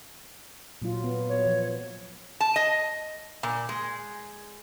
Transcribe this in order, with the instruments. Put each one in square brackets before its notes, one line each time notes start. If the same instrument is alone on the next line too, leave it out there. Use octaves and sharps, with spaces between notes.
[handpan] A#2 F#3 F4
B3
[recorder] C#5
[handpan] F3
[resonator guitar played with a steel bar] A5
D#5
A#2
G#3